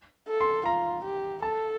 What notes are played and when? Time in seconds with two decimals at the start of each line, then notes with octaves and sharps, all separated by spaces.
0.28 A4
0.41 C6
0.66 F4 A#5
1.04 G4
1.42 A4 A5